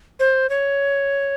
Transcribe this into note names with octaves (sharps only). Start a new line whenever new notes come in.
C5
C#5